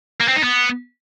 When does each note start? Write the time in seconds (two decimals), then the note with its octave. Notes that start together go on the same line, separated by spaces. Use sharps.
0.20 A#3
0.28 C4
0.36 D#4
0.43 B3